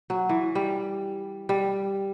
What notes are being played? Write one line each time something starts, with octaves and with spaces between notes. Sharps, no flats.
F#3
E3
G3
G3